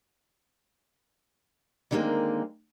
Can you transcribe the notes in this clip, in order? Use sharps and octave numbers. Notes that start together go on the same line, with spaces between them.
D3 D#3 G3 G#3 A#3 C4